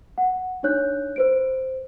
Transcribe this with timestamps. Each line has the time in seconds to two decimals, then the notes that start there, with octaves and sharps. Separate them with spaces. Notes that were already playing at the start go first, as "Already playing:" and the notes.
0.18 F#5
0.63 D4 D#4 C#5 F#6 G6
1.16 B4 C5 D7